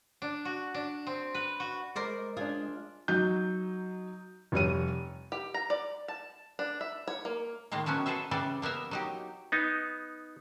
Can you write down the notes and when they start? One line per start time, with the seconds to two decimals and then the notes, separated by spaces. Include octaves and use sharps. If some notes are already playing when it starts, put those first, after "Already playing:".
0.22 D4
0.45 F#4
0.74 D4
1.07 C4
1.35 B4
1.60 F#4
1.96 G#3 A#4 C5 D5
2.37 D4 F4 G#4
3.08 F#3 D#4 G6
4.52 F1 G3 C#5 D#7
5.32 G4
5.54 A#5
5.70 D5
6.08 A5
6.59 D4
6.81 E5
7.08 C#5
7.25 A#3
7.72 A2 D#3 G#3 A#3
7.86 F3 F#3 B3 C#4
8.06 G#4 A4 B4 C5 E5
8.31 C#3 E3 G3 D5
8.62 A#3 B3 A#4 E5
8.91 F#3 D#4 G4
9.52 B3 D#4